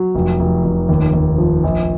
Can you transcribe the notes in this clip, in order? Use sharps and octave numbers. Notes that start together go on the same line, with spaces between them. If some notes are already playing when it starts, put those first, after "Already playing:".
Already playing: F#3
F1
F1
F1
D#2
D#2
F3
A#1